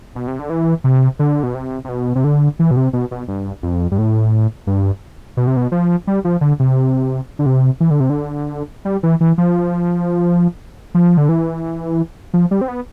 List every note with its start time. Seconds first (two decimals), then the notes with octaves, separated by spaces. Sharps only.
0.15 B2
0.27 C3
0.39 D3
0.50 E3
0.84 C3
1.19 D3
1.43 B2
1.55 C3
1.84 C3
1.89 B2
2.15 C3
2.24 D3
2.59 E3
2.71 B2
2.77 C3
2.93 B2
3.11 B2
3.28 G2
3.63 F2
3.91 G2
3.98 A2
4.67 G2
5.37 B2
5.47 C3
5.57 B2
5.72 F3
6.07 G3
6.25 F3
6.41 D3
6.60 C3
7.39 D3
7.46 C3
7.80 E3
7.91 D3
8.00 C3
8.10 D3
8.85 G3
9.03 E3
9.21 E3
9.38 F3
10.95 F3
11.17 D3
11.29 E3
12.34 F3
12.51 G3
12.61 C4
12.68 B3